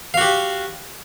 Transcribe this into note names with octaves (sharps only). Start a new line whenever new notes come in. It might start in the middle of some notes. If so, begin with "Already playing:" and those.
F#4 G4 F5